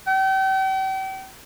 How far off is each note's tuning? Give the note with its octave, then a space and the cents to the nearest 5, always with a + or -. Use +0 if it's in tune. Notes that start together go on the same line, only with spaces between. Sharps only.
G5 -40